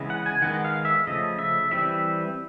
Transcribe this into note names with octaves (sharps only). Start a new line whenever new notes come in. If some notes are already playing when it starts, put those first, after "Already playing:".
Already playing: C#3 E3 G#3 B3
F#5
G#5
D#3 G#3 B3 F#5
F5
E5
C#3 F3 A3 D#5
E5
E3 G3 C4 E5